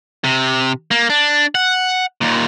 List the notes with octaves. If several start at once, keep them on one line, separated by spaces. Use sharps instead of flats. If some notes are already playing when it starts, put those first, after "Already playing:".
C3
A#3
D4
F#5
D#2 A#2